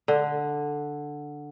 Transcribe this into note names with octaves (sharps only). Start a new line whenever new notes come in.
D3